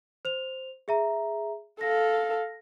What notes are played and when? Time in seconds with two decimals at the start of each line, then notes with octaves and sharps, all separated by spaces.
0.25 C5 F7
0.88 G#4 E5 A#5
1.81 A4 F5 A#6